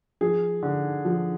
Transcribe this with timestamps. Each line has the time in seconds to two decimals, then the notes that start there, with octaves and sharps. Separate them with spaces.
0.21 F3 G#4
0.63 D3
1.05 F3